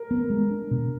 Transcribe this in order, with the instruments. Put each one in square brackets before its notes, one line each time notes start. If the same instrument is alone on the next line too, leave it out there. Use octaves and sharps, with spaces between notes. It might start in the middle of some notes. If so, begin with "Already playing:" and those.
Already playing: [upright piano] A#4
[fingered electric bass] B3
G#3
D4
B2